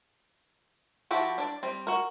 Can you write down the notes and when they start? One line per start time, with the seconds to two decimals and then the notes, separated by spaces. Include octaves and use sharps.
1.11 F3 E4 F#4 G4 A4
1.38 D4 D5
1.63 G3 C4
1.87 F#4 A#4